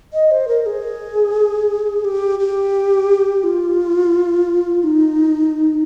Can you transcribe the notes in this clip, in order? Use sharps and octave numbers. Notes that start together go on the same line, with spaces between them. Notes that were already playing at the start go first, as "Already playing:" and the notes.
D#5
C5
A#4
G#4
G4
G4
F4
D#4